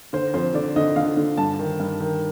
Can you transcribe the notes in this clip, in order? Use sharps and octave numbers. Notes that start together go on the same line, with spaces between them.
D3 C5
F2 C5
D3 D5
D3 D#5
D3 F5
D3
G2 A5
D#3
G2
D#3